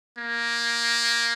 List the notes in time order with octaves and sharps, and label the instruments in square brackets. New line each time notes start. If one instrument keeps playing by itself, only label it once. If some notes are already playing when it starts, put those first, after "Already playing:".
[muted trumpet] A#3